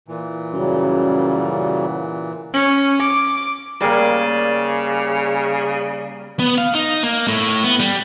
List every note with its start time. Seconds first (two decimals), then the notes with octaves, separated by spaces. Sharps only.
0.08 A#2 E3
0.53 F#2 C#3 F#3 G3
2.54 C#4
3.01 D6
3.82 C#3 G3 A#3 D5
6.39 B3
6.58 F5
6.74 D#4
7.03 A#3
7.28 A2
7.64 B3
7.80 G3